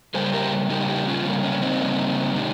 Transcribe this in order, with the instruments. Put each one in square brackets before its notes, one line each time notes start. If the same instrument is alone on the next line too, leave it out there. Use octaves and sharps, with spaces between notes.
[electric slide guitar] C#3 G3 A#3 G#4 C5
G4 A#4
C#3 G3 A#3 D#4 G4
D#4 G4
C#4 F4
C#3 G3 A#3 C#4
C#4
C4 D#4
C#3 G3 A#3
C3 D#3 G#3 D#4 G4